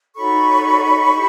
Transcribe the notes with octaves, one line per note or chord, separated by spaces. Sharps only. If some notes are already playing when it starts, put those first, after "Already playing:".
D#4 F#4 A4 C#5 B5 C#6
E4 G4